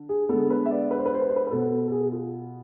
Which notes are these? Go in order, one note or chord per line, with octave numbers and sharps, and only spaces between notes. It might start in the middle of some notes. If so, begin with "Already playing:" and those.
Already playing: D3
G#4
D3 G#3 B3 A4
B4
E5
D5
B4
C5
B4
C5
B4
C5
B4
B4
B2 B3 A4
A4
A4
G#4
G#4
F4